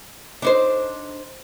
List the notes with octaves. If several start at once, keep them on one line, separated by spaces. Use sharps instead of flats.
D4 D#4 C5